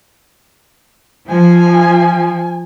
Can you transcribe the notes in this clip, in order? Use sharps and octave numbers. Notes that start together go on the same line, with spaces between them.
F3 G#5